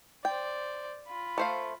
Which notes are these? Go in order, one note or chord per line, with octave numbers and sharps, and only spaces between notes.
C5 D5 G5
F4 B5
A3 C5 F5